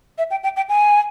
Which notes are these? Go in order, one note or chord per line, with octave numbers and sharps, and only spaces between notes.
E5
G5
G5
G5
G#5